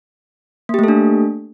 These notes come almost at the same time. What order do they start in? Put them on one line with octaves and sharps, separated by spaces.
A#3 G4 A3 A4 D4